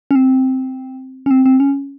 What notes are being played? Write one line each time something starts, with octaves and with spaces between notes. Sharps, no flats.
C#4
C4
C#4
C4
C4
C#4